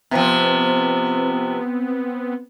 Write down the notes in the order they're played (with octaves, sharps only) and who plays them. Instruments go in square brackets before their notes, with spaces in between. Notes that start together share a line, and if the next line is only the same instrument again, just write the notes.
[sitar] C3 F3 [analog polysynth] B3 C4